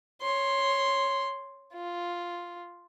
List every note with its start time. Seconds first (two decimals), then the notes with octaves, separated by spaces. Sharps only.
0.21 C#5 C6
1.74 F4